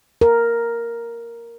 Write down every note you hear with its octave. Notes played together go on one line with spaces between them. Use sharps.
A#4